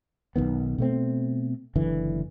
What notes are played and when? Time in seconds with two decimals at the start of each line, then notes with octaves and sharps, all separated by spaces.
0.36 B1 F#2 D#3 B3
0.78 B2 A3 C4
1.75 F#1 D3 E3